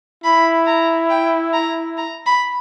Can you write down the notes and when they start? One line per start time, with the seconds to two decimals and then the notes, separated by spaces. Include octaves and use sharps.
0.24 E4 B5
0.67 A#5
1.10 G5
1.53 A#5
1.98 A#5
2.26 B5